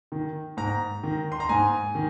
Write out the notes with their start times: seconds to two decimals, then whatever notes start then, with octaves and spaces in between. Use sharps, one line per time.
0.12 D#3
0.57 G#2 A#5
1.03 D#3
1.32 C6
1.40 A#5
1.49 G#2 G#5
1.95 D#3